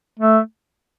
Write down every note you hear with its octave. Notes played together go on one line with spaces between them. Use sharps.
A3